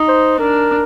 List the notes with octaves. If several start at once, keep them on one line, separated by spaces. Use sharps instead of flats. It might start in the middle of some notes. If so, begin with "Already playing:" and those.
Already playing: D#4
C5
D4 A#4